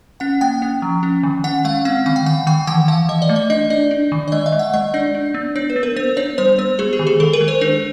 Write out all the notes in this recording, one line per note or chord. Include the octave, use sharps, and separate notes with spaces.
C#4 F#5
A#3 G5
C#4
F3
C#4
D#3
C#4 F#5
G#3 F5
C4 F#5
D#3 F5
G5
D#3 F#5
D#3 G5
E3 F#5
E3 F5
E3 D#5
D5
A3
D#5
D4 D#5
D4 D5
D4
D#3
D5
G#3 D#5
E5
G#3
F#5
G#3 D#5
D4 D5
D4
B3
D4 C#5
B4
B3
A#4
B3 C5
D4 C#5
G3 C5
B3 C5
G#3 G#4
G4
D#3
G#4
D#3 A4
A#4
G#3
C5
D4 C5